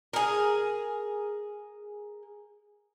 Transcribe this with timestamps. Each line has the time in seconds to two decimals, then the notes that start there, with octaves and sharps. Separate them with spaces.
0.13 G#4 A#4